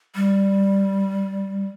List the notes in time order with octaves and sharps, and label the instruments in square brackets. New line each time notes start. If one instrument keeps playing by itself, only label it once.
[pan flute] G3